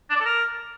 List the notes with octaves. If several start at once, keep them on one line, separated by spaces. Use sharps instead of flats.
D4
D5
A4
A#4